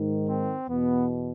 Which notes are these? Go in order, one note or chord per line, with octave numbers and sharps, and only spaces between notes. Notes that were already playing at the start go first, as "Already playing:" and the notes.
Already playing: G#2 D#3
C4
E2 B2 B3